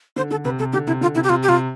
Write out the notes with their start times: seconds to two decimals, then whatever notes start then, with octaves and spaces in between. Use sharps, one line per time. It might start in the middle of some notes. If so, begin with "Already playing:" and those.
0.16 D3 C5
0.31 D3 A4
0.45 C3 B4
0.59 C3 A4
0.73 D3 G4
0.87 C3 E4
1.01 D3 F4
1.15 C3 E4
1.24 G4
1.29 C3 F4
1.43 G4
1.49 C3 F4